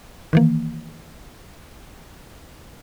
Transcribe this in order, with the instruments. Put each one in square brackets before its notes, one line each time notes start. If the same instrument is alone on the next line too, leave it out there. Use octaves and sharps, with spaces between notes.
[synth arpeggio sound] D#3 E3 A#3